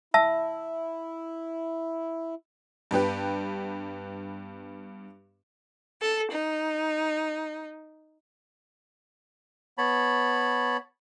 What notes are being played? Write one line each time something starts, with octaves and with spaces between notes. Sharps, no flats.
E4 E5 A5 E6
G2 B3 G4 B4
A4
D#4
B3 C#5 A5 B5